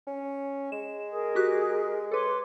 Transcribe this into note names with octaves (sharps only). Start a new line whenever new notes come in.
C#4
G#3 E7
G#4 A#4
F#4 G4 F#6
A4 B4 C#5 C6 D6